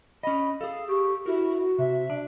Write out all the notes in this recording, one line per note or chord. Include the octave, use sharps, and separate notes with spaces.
C#4 D#5 B5
G#4 A4 F5
G4 C#6
E4 F#4 A#4
C3 E5
D4